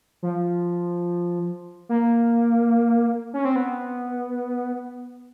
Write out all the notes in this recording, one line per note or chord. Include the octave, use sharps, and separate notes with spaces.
F3
A#3
C#4
C4
B3